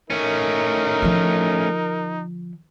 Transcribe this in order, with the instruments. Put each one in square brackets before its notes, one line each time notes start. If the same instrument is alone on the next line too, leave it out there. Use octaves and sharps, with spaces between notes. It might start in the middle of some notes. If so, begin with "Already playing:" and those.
[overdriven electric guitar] A3 C#4 [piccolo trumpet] D#4 [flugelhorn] A#4
[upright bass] D3 F3